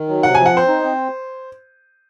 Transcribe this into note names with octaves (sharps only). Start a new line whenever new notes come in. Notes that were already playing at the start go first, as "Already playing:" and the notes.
Already playing: D#3
F#3
C3 F#5
F3 G#5
F#5
C4 C5
D#4
C4